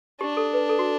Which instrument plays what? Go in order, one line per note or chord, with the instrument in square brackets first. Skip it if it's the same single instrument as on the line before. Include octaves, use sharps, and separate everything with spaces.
[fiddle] D4 [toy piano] G4
[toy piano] A4
B4
A4
F#4